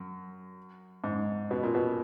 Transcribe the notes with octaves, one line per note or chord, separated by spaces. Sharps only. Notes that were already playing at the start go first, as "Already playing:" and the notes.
Already playing: F#2
G#2
B2
A#2
B2